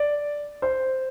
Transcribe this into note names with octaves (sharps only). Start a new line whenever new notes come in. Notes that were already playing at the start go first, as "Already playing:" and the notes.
Already playing: D5
C5